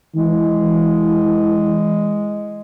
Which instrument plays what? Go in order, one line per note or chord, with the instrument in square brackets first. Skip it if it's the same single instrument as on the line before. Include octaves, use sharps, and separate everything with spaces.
[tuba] E3 [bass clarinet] G#3